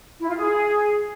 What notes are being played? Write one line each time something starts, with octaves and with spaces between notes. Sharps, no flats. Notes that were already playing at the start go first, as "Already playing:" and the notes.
E4
F4
G#4